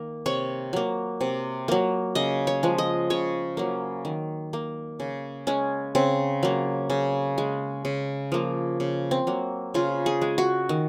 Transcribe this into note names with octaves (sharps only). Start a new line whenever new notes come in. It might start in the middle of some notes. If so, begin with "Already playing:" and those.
Already playing: D#3 A#3
C3 C#5
F#3 A#3
C3
F#3 A#3
C#3 D#5
C#5
F3 G#3
D#5
C#3 C#5
F#3 A#3
D#3
A#3
C#3
G#3 C#4
C#3 C4
F#3 A#3
C#3
G#3
C#3
F3 A#3
C#3
C4
F#3 A#3
C#3 F4
G#4
G#3
F#4
D#3